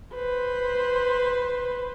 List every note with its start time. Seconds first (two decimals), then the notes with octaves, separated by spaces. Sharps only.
0.15 B4 C5